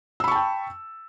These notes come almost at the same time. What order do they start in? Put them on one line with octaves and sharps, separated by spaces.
E6 B5 C#6 A5 G5